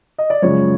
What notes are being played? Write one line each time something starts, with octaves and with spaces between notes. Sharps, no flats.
D#5
D5
F#2 C#3 F3 G#3 C#5